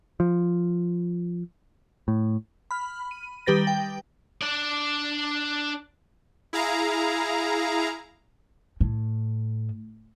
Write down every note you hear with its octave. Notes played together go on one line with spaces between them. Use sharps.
F3
A2
B5 F6
D#7
D#3 G3 G4 B4 A6 A#6
G5
D4 D5
E4 G#4 F5 A#5
A2